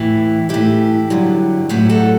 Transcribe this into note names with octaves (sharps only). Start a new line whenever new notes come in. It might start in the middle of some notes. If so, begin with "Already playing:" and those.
Already playing: A2 E3 E4 G4
A2 E3 E4 G4
G2 D3 F#3
A2 F#3 E4 G4
F#4 A4